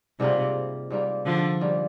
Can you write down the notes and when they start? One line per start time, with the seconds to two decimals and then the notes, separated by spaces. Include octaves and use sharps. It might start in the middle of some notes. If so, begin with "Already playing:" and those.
0.20 G#2 C3 G3 A#3 F4
0.90 G#2 G3 A#3 F4
1.26 D3 F3
1.61 G#2 G3 A#3 F4